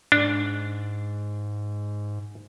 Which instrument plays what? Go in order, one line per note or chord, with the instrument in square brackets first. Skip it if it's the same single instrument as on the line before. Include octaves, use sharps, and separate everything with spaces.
[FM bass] G#2 [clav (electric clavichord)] D4